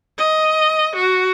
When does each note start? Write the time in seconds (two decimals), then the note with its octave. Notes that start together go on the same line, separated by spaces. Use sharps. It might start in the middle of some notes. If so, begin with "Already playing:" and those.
0.18 D#5
0.96 F#4